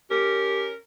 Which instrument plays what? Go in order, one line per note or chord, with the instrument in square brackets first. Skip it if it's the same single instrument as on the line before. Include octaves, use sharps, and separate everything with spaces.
[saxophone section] C#4 A#4 [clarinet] G4